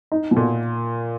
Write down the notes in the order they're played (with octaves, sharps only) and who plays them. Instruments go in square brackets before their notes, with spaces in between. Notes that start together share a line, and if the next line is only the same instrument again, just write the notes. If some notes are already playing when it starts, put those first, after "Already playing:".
[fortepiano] D#4
B2
[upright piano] A#2